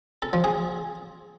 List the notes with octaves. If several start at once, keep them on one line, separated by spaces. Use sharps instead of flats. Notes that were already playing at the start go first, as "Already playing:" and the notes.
A4
F3
G#4